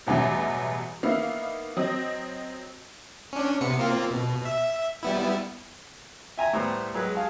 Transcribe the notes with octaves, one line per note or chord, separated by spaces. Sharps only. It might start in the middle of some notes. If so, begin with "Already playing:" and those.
A1 E2 B2 F#3 G3
A#3 B3 D#4 E4 F5
F#3 C4 D#5
C#4 D4
C3 B3 C#7
A#3 C4 F4
B2
E5
G3 B3 E4
E5 G#5 A#5
A2 G3 B3 C5 A#5
F#3 G#3 B4
G#4 F5 A5